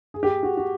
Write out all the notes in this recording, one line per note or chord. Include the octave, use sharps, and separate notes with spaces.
G#4
G4
G#4
F#4
F#4